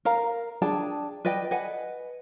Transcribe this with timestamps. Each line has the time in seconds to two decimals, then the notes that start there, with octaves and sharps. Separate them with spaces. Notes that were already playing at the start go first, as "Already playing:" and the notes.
0.05 A#4 F5 A#5
0.62 D4 G#4 G5 A5
1.25 B4 D5 D#5 G5
1.51 B4 D#5 F#5 G#5